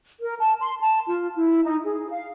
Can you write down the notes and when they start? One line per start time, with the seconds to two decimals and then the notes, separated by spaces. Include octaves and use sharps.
0.21 A#4
0.38 A5
0.60 C6
0.80 A5
1.07 F4
1.36 E4
1.63 D#4
1.84 G#4
2.10 F5